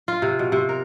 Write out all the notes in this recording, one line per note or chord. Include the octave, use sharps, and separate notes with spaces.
F4
C3
B2
C3
A#4